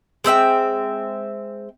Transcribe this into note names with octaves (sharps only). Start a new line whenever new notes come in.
G#3 C4 E5 G5